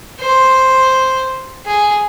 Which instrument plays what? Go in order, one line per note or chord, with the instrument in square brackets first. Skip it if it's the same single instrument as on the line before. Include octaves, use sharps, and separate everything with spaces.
[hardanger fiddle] C5
G#4